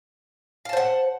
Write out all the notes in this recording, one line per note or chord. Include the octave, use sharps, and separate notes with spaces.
C5 F5 F#5 A5